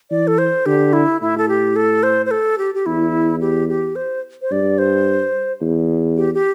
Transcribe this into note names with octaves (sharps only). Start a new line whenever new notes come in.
E3 D5
A4
C5
D3 G4
E4
A2 E4
A4
G4
A4
C5
C5
A4
G4
G4
E2 E4
G4
G4
C5
C5
G2 D5
C5
E2
G4
G4